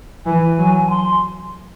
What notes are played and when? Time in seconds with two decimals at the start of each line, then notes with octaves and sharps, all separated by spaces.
0.26 E3 G#5
0.58 F#3
0.87 A5
0.90 C6